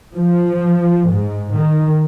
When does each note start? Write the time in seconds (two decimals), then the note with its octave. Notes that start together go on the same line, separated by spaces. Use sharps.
0.15 F3
1.12 G#2
1.57 D#3